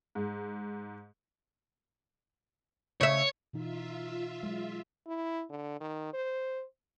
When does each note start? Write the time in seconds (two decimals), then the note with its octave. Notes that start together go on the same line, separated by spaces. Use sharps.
0.15 G#2
3.01 C#3 C#5 E5
3.53 B2 E3 D#4 F4 E5
4.43 F#3 G#3
5.06 E4
5.50 D3
5.81 D#3
6.13 C5